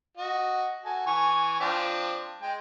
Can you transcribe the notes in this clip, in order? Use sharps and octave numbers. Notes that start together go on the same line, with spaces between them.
F#4 D#5
F#4 A4 G#5
E3 G#5 C#6
F3 C4 D4
G#3 G5